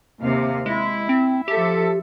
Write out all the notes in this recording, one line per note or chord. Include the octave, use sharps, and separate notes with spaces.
D#2 C3 F5
G#3 E4
C4
F3 G4 A4 E5